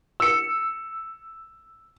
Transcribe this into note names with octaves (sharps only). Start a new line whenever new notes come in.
E6 C#7